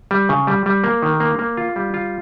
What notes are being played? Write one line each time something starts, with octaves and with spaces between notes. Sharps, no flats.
G3
C#3
G3
G3
A#3
D#3
A#3
A#3
F4
G3
F4